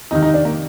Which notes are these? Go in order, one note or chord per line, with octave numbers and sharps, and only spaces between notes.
F2 C3 D#3 D#4
D#4
D4
A#3